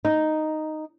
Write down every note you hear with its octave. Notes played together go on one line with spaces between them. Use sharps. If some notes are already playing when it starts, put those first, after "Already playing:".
D#4